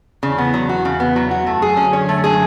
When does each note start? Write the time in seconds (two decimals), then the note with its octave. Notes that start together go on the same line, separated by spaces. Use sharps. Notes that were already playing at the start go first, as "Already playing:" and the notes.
0.23 E2 C#3 E3
0.38 B3
0.54 F#3
0.69 F#4
0.85 C#3
1.00 B3
1.16 F#3
1.31 F#4
1.47 F#2 F#3 A3
1.62 G#4
1.77 D3 C#4
1.93 C#5
2.08 D3 A3
2.24 G#4